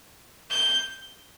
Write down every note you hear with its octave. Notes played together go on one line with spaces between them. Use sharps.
G6